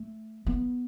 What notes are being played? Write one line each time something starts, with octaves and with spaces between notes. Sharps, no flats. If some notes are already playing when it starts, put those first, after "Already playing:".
Already playing: A3
B3